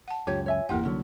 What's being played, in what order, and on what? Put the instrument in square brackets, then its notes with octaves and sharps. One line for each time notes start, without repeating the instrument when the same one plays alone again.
[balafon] F#5 A5
[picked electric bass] C#2 F#2 [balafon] F4 G5 [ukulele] G4 C#5
[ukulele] C#5 E5 G#5
[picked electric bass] D1 G1 E2 [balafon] A#3 E4 F#5 [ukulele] G4 A#4
[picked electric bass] C2 D3 F#3 [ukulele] C#4